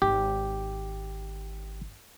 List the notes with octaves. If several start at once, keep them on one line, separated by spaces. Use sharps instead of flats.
G#1 D#4 G4